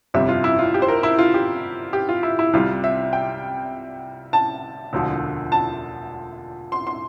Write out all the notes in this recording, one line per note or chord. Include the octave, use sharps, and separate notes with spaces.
G1 F2 C3 G3 E5
F4
E4
F4
G4
C5
A#4
E4
F4
G4
G4
F4
E4
E4
C2 C3 G3 F4
E5
G5
A5
E1 D2 D3 F3
A5
C6
C6